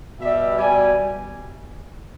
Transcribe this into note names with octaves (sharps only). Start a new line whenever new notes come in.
B2 G3 E5
B2 G3 G#5